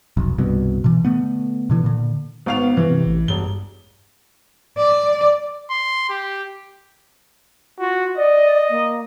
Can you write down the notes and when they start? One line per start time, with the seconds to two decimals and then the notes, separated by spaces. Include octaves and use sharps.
0.17 F1 B1
0.38 C2 G2 B2
0.84 B2 E3
1.05 D3 A3 B3
1.70 B2 D3 E3
1.84 A#2 D3
2.46 G#1 B3 F5 F7
2.77 G2 E3
2.90 C3
3.06 A1
3.28 E1 G2 G7
4.77 D5
5.70 C6
6.10 G4
7.79 F4 F#4
8.17 D5 D#5
8.70 A#3